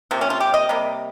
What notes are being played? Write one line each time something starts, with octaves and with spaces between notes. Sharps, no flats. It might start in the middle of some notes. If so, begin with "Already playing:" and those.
C3 F3 A#3 C4
C#4
F4
G4
D#5
C3 G3 A#3